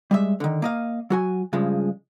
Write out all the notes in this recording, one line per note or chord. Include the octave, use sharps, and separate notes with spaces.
G3 G#3 E5
D3 D#3
A#3 D#5 F5
F#3 F#4 G#5
G2 C#3 F3 G#3